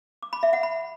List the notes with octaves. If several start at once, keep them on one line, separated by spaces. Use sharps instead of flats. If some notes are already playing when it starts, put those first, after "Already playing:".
D6
B5
E5
F#5
B5